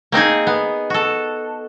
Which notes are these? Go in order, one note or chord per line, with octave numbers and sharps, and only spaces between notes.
A#3 C4 D#4 G#4
B3
F#4 A4